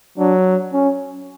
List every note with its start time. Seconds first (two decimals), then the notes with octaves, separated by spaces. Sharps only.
0.18 F#3 D4
0.73 C#4